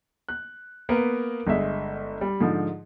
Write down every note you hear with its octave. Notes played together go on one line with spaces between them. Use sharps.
F#6
A#3 B3 A#4 B4
G1 G#3 E5
G3
G#2 D3 F3